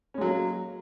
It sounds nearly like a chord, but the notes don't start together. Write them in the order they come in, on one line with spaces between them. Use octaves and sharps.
C#4 G#3 F#3 A#3